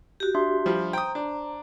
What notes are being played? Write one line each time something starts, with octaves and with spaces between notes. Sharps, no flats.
F#4 G4
D4 E5 C6
F3 G3
C5 G5 A#5 D#6
D4